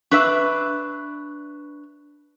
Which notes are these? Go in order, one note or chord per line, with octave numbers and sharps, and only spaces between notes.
D4 B4 E5 C#6 F#6 B6